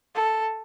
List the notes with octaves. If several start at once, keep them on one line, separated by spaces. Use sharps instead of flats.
A4